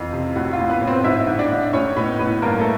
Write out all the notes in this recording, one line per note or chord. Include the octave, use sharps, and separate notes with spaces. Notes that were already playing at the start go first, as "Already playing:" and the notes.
Already playing: F2 E3 F4
C3
A2 F#4
F4
A2
B3 B4
A2
C4 C5
G#2 E4 E5
G#2
D4 D5
G#2
A2 C#4 C#5
A2 B3 B4
A2 B3 B4
G2 A#3 A#4
A3 A4